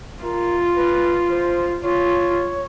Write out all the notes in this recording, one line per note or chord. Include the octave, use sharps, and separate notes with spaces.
F4 A#4
B4
C5
F4 C#5